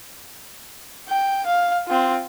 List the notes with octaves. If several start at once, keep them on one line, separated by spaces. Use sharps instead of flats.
G5
F5
C4 F4